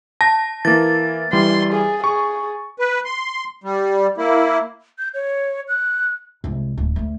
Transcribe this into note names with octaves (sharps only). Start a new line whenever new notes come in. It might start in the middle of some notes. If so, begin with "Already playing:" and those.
A5 A#6
E3 A#3 A6
E3 G3 C6
G#4
G#4 C#6
B4
C6
G3
A#3 E4
G6
C#5
F#6
C2 G#3
D1
D2 A3